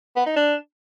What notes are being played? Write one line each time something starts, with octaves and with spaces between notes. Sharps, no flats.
B3
D#4
D4